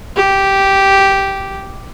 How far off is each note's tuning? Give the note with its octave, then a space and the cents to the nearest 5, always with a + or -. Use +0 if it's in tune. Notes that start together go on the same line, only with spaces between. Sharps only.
G4 -5